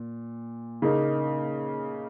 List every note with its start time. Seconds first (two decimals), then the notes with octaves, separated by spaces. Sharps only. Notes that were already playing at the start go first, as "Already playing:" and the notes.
Already playing: A#2
0.82 C#3 A#3 D#4